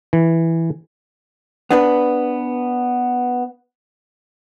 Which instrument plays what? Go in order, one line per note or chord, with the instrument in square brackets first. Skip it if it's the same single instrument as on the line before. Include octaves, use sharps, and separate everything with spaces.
[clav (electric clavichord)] E3
[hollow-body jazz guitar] B3 D4 B4